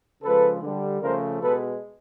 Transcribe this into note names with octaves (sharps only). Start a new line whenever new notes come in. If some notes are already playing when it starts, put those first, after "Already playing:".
C#3 F3 G#3 A4 B4
D3 G3
C#3 F3 A3 A#4 C5
B2 G#3 A4 B4